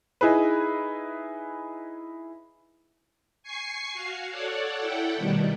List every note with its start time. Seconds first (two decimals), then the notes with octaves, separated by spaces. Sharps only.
0.21 D#4 E4 G#4 B4
3.43 G#5 C#6 C7
3.93 F#4 F5
4.30 A4 C#5 D5 F#5
4.80 E4 A4 F#5 G5
5.16 B2 D#3 G3 A3